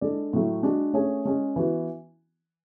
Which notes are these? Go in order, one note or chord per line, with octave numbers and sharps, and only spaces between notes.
G#3 D4 A4 D5
A2 F#3 A3
G#3 D4 F#4
A3 C#4 G#4 C#5
G#3 C#4 G#4
E3 B3 F#4